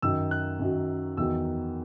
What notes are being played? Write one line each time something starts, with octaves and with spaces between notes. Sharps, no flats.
F#2 D#3 F#3 E6
F#6
F#2 D#3 F#3
E2 D#3 F#3 E6